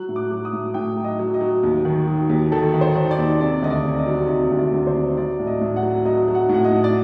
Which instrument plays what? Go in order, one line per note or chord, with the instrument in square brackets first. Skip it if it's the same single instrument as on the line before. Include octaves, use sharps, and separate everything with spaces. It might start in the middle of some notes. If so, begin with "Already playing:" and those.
Already playing: [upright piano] F#3 F#6
A2
D6
F#3
D#6
A2
A2 G5
F#3
D#5
F#3
D#5
F#3
D#2
D#3
F#3
D#2
D#3 A4
D#3
C5
D#3
D5
D#2
C3 D5
D2 D#5
D5
C3
D#5
F#3
C3 D#5
D2
D5
D2
C5
C3
F#3 D5
A2
D#5
A2
F#5
F#3
F#3 D#5
F#3
F#5
A2
F#5
D#5
A2
D5